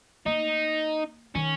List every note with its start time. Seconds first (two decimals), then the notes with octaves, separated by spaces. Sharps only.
0.26 A#3 D#4
1.35 D#3 C#4